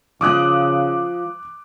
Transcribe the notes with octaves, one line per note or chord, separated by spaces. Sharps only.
C#3 F3 F4 D6 D#6 F#6